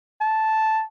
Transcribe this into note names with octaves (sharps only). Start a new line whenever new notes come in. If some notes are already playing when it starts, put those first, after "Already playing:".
A5